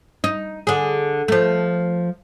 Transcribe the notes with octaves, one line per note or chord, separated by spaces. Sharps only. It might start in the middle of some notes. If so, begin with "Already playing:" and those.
D#4
D3 G#4
F3 A3